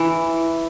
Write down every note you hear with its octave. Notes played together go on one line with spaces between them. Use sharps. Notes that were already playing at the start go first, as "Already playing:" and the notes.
Already playing: E3